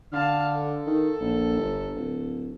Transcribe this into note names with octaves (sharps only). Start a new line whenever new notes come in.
D3 F5 A5
A4
D#3
A#1
G1
D1